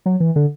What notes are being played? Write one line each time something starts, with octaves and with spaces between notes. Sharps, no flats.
F#3
E3
D3